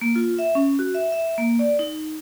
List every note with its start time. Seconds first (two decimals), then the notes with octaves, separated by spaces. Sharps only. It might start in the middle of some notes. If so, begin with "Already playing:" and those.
0.01 A#3
0.16 F4
0.39 E5
0.55 C#4
0.79 F#4
0.94 E5
1.12 E5
1.38 A#3
1.59 D5
1.79 D#4